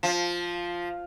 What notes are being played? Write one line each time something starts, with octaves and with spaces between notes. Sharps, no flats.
F3